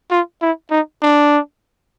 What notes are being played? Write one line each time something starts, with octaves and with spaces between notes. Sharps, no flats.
F4
E4
D#4
D4